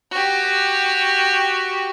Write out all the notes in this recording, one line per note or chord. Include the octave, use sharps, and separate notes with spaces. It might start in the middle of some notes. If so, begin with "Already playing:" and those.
F#4 G4